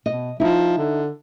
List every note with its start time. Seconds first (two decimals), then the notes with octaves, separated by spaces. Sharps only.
0.06 B2 D#5
0.40 F3 D#4 E4
0.78 D3